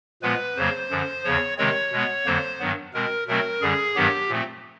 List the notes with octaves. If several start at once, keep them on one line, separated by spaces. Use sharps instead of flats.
A#2 F3 G#3 B3 B4
F2 C#3 F#3 A#3 C5
F#2 D3 F3
E2 C#3 F3 C#5
C3 D#3 G#3 C4 C#5
B2 G#3 B3
F2 D3 F#3 A#3 C5
G2 D#3 F#3 B3
B2 G#3 C4 A#4
B2 F#3 A3 C4 A#4
F#2 D3 G3 G#4
G2 D#3 F#3 B3 G4
A#2 F3 A3 C4